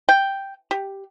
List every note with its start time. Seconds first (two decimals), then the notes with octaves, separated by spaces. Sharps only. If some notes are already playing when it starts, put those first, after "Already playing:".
0.09 G5
0.71 G4